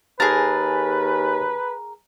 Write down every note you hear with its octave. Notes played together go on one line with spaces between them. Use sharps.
D#2 G#4 A#4 B4 G#5 A5 A6